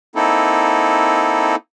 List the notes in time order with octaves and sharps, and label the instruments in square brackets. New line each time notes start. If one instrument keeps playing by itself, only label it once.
[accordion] A#3 C4 D#4 E4 A4